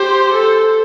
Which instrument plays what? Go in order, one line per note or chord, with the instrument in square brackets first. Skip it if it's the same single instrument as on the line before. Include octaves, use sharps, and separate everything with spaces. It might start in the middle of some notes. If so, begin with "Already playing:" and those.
Already playing: [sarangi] G4 [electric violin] C5
[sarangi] A4